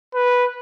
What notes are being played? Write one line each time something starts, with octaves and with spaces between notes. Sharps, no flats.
B4